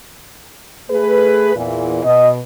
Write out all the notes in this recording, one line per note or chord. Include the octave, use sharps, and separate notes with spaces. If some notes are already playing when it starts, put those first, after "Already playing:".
A3 G#4 B4
E2 A#2 E3
B2 D#5